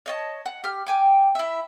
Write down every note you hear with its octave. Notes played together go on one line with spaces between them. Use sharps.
C#5 D#5 A5
F#5
G4 F6
G5 G#5 D6
E4 E5